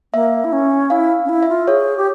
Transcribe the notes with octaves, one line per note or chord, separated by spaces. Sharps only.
A#3 E5
E4
C#4
E4 F5
C#4
E4
E5
F4
G#4 C#5
G4